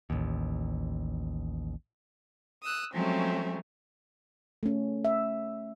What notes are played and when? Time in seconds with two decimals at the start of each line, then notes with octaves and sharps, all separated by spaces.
0.10 A1 D#2
2.62 D#6 E6 F#6
2.93 F3 F#3 G#3 A3 C4 C#4
4.63 A3 C#4
5.05 E5